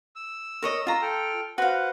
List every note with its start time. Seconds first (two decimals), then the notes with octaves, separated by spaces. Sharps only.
0.16 E6
0.62 A#4 C#5 D#5
0.87 F4 A#5
1.02 A4 G5 F6
1.58 F#4 B4 C5 F5 F#5